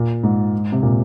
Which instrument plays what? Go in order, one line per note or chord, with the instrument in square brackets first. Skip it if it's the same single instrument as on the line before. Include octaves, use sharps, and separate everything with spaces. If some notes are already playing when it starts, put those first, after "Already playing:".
Already playing: [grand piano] A#2
G#2
C3
A#2